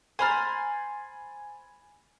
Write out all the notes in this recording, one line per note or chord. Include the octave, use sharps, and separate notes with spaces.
C5 G#5 A#5 B5 F6 A6